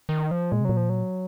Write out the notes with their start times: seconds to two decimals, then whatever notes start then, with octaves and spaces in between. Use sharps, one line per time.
0.09 D#3
0.31 F3
0.52 A#2 G#3
0.61 C3
0.65 A#2 F#3
0.77 F3
0.89 F#3